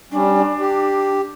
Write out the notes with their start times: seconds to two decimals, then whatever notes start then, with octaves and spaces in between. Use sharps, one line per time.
0.12 G3 C#4 D4
0.60 G4